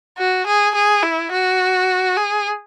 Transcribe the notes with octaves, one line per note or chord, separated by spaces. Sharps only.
F#4
G#4
G#4
E4
F#4
G#4